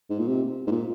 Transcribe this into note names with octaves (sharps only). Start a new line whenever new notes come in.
G#2
A#2
C3
G#2
A#2